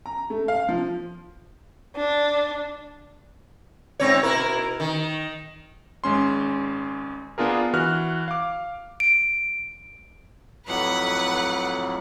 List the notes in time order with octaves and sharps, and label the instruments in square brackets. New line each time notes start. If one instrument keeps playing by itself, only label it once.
[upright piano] A#5
A3
F5
F3
[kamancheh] D4
[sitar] G#2 C4 C#5
B2 E4 A#4
D#3
[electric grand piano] G#1 G#3 C#4 C6
B3 D4 F4 G#4 A#4
E3 F#4 F6 F#6
F5 D6
[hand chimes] D7
[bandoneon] F2 A2 F#3 [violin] B4 F#5